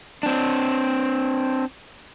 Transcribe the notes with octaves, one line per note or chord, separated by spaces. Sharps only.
C4 D4